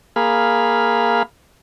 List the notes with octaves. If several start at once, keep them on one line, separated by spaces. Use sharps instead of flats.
A#3 G#4 F5 B5